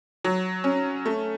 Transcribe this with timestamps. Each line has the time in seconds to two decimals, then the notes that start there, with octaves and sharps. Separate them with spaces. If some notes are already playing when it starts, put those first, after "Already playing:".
0.24 F#3
0.64 C#4
1.06 A3